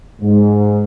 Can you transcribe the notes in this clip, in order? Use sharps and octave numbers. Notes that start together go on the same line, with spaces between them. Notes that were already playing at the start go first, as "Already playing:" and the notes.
G#2